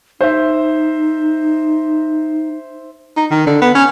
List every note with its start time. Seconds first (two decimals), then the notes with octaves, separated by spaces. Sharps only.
0.21 D#4 C5 E5
3.17 D#4
3.31 D#3
3.47 D3
3.62 B3
3.75 C#4